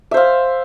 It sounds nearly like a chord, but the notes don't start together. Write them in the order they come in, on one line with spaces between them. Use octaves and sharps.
E5 C5 F5